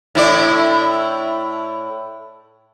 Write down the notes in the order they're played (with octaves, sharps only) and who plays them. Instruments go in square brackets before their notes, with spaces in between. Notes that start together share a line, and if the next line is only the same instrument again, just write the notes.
[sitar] A2 E4 D5